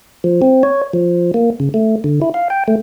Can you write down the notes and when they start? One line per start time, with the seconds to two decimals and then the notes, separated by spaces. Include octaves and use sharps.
0.24 F3
0.42 C4
0.63 C#5
0.93 F3
1.34 A#3
1.60 C#3
1.74 A3
2.04 D3
2.22 E4
2.34 F5
2.50 G5
2.68 A3